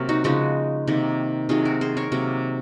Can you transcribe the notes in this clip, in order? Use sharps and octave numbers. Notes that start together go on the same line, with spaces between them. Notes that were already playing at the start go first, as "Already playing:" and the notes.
Already playing: C3 F#3 A#3 A#4 C#5
D#4 F#4
C#3 F3 G#3 D#4 F#4
C3 D#3 A#3
C3 D#3 F#3 F4 G#4
F#4 A#4
G#4 C5
A#4 C#5
C3 F#3 A#3